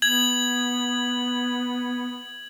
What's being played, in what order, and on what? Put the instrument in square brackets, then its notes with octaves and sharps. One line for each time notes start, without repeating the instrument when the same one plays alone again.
[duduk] B3 [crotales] G#6 F#7